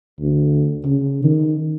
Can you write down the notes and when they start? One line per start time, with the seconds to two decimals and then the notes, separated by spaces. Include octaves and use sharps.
0.21 D2
0.85 C#3
1.24 D#3